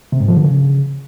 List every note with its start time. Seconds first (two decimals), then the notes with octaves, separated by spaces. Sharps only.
0.12 C3
0.20 G#2
0.28 F3
0.36 D3
0.44 C#3